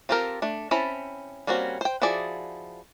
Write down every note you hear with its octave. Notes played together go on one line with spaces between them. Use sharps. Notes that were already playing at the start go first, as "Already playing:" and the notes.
C4 F4 G4 A4 A#4
A3 D4
C4 C#4 E4 A5 B5
G3 A#3 C4 C#4 F#4
C5 G5
F3 E4 F#4 G#4 D5